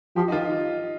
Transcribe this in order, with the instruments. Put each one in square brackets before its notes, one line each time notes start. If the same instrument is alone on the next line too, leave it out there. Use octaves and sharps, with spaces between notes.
[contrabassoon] F3 [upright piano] G4
[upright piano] D#4
[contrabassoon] D#3 [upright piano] F4